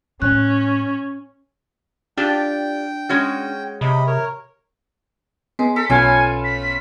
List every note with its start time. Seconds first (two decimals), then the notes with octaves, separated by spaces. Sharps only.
0.22 A2 C#4 F#6
2.17 D4 F4 G4 D5 G5
3.09 G#3 C#4 F#4
3.81 C3 D#5 B5
4.07 A#4 C#5
5.59 G#3 B3
5.76 A4 B6
5.89 B1 B2 A3 C#4 F4 G#5
6.44 B6